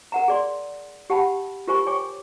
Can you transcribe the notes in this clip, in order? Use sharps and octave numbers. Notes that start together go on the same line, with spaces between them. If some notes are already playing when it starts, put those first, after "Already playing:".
A#4 F#5 A#5
G#4 D5 C6
G4 F#5 G5 A5 B5
F4 G4 A#4 C5 G#5 C#6
C#5 G5 G#5 C#6 D6